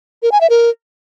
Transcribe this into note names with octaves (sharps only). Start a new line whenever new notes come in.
A#4
G#5
E5
A#4